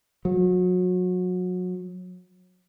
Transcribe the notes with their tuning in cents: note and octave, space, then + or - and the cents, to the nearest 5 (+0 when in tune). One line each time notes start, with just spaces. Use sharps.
F#3 -30